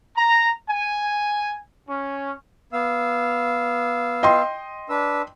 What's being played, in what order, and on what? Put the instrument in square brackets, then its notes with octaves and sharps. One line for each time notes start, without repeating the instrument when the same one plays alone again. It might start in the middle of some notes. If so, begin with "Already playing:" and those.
[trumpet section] A#5
G#5
C#4
[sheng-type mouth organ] B3 F5 E6
[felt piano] D#5 G5 C6
[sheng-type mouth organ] D4 B4 E6